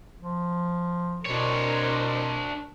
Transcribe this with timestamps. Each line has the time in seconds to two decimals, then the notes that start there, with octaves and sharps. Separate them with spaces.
0.21 F3
1.26 B2 D4 A#4 C5 C#5